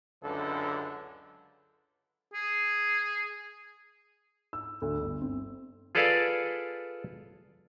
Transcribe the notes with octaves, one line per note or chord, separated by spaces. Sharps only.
C#2 F#2 D3 A4 B4
G#4
E6
D2
G1
C4
F4 G#4 A4 B4 D5 F5